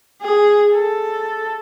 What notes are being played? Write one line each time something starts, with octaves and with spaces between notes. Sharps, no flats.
G#4
A4